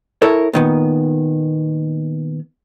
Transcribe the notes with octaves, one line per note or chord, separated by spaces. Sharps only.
E4 A4 A#4 C#5
A#2 D#3 B3